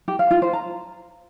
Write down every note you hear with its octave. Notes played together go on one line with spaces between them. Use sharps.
G4
F5
F4
C5
A#5